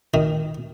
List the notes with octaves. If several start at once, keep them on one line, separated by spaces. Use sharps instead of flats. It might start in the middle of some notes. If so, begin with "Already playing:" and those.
D#3